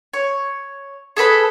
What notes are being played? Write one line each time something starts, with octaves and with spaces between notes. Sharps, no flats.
C#5
G#4 A4 B4 B5